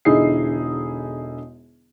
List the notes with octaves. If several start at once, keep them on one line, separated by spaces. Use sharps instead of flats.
E1 D3 D#4 E4 G#4 C7